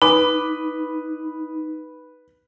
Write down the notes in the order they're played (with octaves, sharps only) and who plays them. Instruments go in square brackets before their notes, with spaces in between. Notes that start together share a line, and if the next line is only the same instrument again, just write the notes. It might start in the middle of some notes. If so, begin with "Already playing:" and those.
[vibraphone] D#4 [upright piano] B4 B5 D6